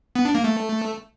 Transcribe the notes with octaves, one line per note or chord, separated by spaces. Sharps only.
B3
D4
A#3
A3